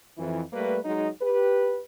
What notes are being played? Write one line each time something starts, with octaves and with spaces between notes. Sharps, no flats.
F2 E3
G3 A3 A#3 B4
F#3 G#3 D#4
G4 B4